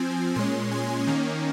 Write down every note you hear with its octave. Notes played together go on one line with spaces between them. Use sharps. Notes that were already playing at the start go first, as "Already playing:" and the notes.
Already playing: F3 C4 G#5
A#2 G#3 C#4 C6
G#5
D#3 A#3 C#4